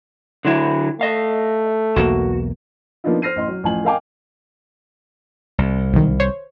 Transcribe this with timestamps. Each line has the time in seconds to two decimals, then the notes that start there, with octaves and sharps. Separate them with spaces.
0.45 D3 F#3 E4
1.01 A3 D#5 F5
1.96 B1 E2 A#3 F#4
3.04 F3 A#3 B3 D4 D#4 F4
3.22 C5 F6 A#6 C7 D#7
3.36 A1 D#5 C6
3.48 F#3
3.64 A1 F3 G#5 F#7
3.85 A#4 D#5 F5 G5 G#5 D6
5.58 C2
5.93 B1 D#3
6.20 C5 C#5